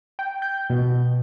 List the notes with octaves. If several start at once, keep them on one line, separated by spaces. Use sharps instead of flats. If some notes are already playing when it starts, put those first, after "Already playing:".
G5
G6
B2
B2